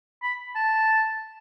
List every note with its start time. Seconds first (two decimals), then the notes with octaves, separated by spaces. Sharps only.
0.23 B5
0.56 A5